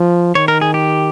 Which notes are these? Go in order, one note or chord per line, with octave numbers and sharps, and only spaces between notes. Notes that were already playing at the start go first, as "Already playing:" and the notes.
Already playing: F3
D#3 C#5
A#4
G#4
G4